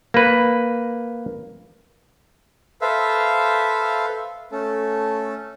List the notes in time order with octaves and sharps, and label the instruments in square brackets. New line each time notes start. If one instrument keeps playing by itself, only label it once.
[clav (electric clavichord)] A#3 B4
[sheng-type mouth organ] A4 B4 C5 E5 F5
A3 C#4 A4